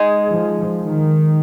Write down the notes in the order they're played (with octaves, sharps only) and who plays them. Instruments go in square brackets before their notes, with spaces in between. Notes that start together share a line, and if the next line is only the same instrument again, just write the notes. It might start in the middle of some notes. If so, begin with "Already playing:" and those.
Already playing: [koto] G#3 D#4 G#4
[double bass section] F3
D#3